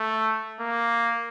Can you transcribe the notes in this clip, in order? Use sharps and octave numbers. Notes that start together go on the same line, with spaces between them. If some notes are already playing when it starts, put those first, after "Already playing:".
Already playing: A3
A#3